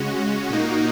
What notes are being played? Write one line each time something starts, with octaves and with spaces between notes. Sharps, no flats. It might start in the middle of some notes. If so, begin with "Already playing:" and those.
Already playing: C#3 G#3 C#4 F#4
F#4
A#2 A#3 D#4